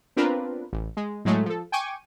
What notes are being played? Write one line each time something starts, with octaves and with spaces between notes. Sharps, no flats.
B3 C4 D4 F4 A#4 B4
A1
G#3
A2 F#3 G#3 A3
F3 A4
G5 G#5 C#6 D6 D#7